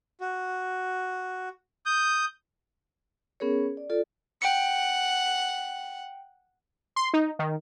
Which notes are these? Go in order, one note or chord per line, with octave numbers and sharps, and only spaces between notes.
F#4
D#6 G6
B3 C#4 G#4 A#4 C#5
D5
F4 A4 D5
F#5 G5 C#7
C6
D#4
D#3